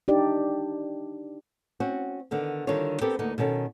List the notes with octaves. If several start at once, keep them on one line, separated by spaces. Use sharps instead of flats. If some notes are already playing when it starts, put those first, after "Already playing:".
D4 D#4 G4 D5
C4 C#4 F#4
D3 D#3 B3
D3 D#3 G3 D4 F4 C#5
B3 C4 G4 A4 A#4
D2 A#3 B3 D#4 A4
B2 D#3 C#4 A4